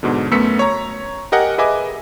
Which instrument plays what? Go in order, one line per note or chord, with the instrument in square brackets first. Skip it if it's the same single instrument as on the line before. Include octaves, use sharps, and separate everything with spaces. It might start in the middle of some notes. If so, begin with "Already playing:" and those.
[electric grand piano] G#2 B2 D3
F#2 A3 B3 E6 B6 C#7
C#5 A#5
G4 A#4 D#5 F#5 G#5
G#4 B4 D#5 E5 G#5 D6